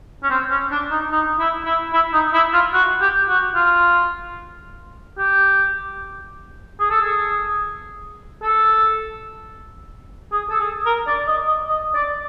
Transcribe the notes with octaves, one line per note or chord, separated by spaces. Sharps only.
C#4
C4
C#4
D4
D#4
D#4
E4
E4
E4
D#4
E4
F4
F#4
G4
F#4
F4
G4
G#4
A4
G#4
A4
G#4
A4
G#4
A#4
D5
D#5
D#5
D#5
D5